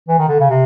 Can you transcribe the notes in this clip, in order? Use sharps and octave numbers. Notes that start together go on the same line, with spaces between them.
E3
D#3
D3
C#3
C3